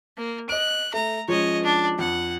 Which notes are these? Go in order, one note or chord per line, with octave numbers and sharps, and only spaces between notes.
A#3
D#5 F#6 D7
A3 A#5
F3 G#3 C#4 C#5 D#5
D4
F2 F#5